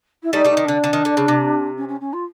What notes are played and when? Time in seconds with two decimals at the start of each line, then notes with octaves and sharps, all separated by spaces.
0.23 E4
0.33 G3 A3 D#4
0.45 G3 A3
0.49 D#4
0.57 D#3
0.64 D3 D4
0.84 D3
0.93 D#3
1.05 D3
1.17 C#3
1.28 C3
1.77 C#4
1.88 C#4
2.00 C#4
2.13 F4